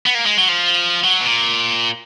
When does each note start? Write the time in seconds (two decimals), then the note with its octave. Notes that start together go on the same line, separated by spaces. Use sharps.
0.06 B3
0.15 A#3
0.26 G#3
0.37 F#3
0.48 F3
1.04 F#3
1.21 B2
1.27 A#2